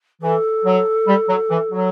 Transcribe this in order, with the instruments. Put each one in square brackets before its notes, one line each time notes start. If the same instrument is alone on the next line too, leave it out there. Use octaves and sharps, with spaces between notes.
[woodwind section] E3 [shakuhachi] A4
[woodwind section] F#3
G3
F#3
E3
F#3